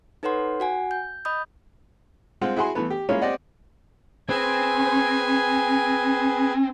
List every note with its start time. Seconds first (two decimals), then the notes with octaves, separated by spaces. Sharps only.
0.23 D#4 A4 B4 C#5 F#5 C6
0.60 F#4 F#5 G#5
0.91 G6
1.25 D#5 B5 D#6 G6
2.41 G#3 C4 F4 F#5
2.56 E4 F#4 G#4 F#5 G#5 C6
2.75 E3 A3 B3
2.90 G4
3.09 G#3 A#3 C#4 E4 F4
3.21 C4 G4 D5 D#5 F#5
4.29 C4 G#4 B4 G#5